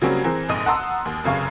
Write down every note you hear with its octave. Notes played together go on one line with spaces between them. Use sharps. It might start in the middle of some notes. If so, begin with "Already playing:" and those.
C#3 F#3 G3 A#3 C4 C#4
E3 C4 G#4 A#4
F1 A#1 G#2 D#5 D#6 D#7
F#5 A5 A#5 C6 D#6 E6
D#2
F1 F#2 C#3 F5 C#6